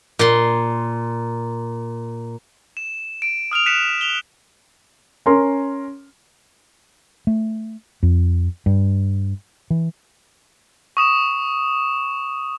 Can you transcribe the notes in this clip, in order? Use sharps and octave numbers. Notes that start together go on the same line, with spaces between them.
A#2 C6
E7
D7
D#6 F6 D7 F7
F#6 B6 C#7 D#7 E7
F7 G7
C#4 A#4 C6
A3
F2
G2
E3
C#6 D#6 E7